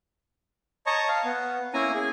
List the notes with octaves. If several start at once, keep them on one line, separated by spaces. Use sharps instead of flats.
C#5 D#5 A5 A#5 C#6
F5
B3
A#3 C#4 E4 G#5 A#5
G#4